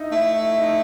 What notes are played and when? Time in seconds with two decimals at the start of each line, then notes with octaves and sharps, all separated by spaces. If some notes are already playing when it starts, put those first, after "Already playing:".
Already playing: D#4 E4
0.12 A3 E4
0.35 E4
0.58 D#4